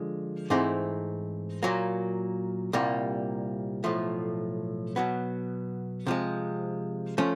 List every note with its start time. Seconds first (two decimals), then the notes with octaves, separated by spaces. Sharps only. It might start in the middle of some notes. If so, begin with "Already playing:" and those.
Already playing: D3 F3 G#3
0.50 G#2 E3 A3 C4 D#4
1.63 A#2 F#3 A#3
2.73 C2 A#2 G3 A#3
3.84 B1 A2 F3 A3
4.96 B2 F#3 B3
6.07 C3 F3 G#3
7.18 F3 A3 C#4